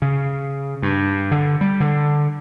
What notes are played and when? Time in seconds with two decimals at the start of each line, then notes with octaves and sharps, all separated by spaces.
0.02 C#3
0.82 G2
1.31 D3
1.61 G3
1.80 D3